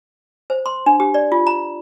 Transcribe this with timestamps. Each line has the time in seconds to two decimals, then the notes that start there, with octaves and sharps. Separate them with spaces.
0.50 C5
0.66 C6
0.86 D4
1.00 G4
1.14 D5
1.32 F4
1.47 A#5